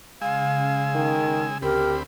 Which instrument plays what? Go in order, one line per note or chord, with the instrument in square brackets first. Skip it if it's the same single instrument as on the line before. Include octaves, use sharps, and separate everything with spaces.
[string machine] C#3 [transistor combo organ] G#3 G#5 E6 [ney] F5
[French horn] D#3
[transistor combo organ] D2 C4 B5 [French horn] G4 [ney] A#4